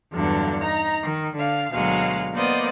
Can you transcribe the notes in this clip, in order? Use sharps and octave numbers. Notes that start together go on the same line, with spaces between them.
E2 G2 D3 F#3
D#4 A#5
D#3
D3 F5
D2 B2 F#3 G#3 F5
A#3 B3 C5 D5 D#5